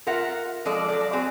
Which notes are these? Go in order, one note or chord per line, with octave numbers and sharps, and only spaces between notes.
F4 A#4 E5 F#5
F3 G#3 A4 D5
F#3 D5
C4 F#4 G#4